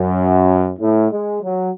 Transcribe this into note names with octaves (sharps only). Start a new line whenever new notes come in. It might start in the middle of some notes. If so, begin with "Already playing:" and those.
Already playing: F#2
A2
G#3
F#3